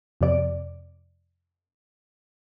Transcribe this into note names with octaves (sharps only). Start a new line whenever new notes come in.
F2 C3 D5 D7